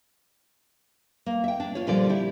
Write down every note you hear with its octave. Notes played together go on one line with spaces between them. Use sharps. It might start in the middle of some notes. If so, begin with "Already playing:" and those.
A#3
E5 G5
D4
F4 C#5
A#2 D3 F3 G3 D5
E4 G4